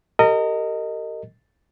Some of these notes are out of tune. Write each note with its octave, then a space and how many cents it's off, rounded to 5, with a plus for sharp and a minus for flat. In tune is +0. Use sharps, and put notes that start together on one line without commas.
G4 +0 A#4 -35 D#5 +0